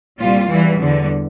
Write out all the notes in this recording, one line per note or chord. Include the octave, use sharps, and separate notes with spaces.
C2 A#2 G3 F4
E2 E3 G3
E2 D3 G3